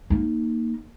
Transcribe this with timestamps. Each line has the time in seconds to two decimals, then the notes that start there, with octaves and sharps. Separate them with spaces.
0.10 A#3 D#4